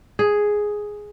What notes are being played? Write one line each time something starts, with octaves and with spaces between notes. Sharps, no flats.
G#4